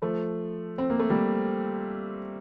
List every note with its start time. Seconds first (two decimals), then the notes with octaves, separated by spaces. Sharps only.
0.02 F3 A3
0.78 C4
0.90 A#3
0.99 A3
1.10 G3 A#3